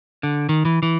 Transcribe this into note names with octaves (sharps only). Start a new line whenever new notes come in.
D3
D#3
E3
E3